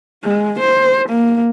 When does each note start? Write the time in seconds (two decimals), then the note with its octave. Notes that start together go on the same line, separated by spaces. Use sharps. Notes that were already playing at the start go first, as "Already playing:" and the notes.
0.24 G#3
0.60 C5
1.09 A#3